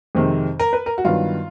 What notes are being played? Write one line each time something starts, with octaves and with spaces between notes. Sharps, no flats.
F2 C3 D#3 G#3 C4
A#4
B4
A#4
F#4
G2 D#3 F#3 B3 F4